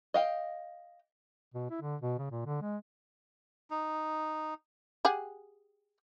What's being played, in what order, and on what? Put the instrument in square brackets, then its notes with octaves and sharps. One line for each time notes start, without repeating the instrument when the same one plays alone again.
[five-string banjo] D#5 F5 G5
[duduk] B2
E4
D3
B2
C#3
A#2
D3
G#3
[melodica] D#4
[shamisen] G4 G#4 F#5